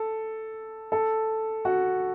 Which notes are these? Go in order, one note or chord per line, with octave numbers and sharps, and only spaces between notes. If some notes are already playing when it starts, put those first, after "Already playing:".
Already playing: A4
A4
F#4